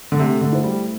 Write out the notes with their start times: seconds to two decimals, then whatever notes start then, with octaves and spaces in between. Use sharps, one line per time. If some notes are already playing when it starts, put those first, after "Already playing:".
0.12 D3
0.19 C3 A3
0.41 D3
0.52 E4 C5
0.64 G3